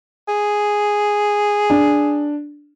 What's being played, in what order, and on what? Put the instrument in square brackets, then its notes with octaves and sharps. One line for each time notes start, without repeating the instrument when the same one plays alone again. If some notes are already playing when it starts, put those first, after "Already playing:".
[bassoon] G#4
[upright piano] D4